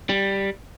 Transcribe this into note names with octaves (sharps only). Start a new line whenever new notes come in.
G3